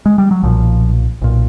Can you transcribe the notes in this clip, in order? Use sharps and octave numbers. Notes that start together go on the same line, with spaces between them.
G#3
G3
F#3
B1 A#2 F3
B1 A#2